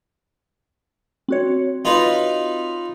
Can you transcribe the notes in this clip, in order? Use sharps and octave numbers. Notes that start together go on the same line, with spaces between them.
C4 F#4 C#5
D#4 F4 B4